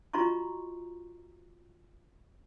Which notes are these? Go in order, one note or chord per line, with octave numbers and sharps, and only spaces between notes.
F4 F#4 D#5 A#5 C6 C#6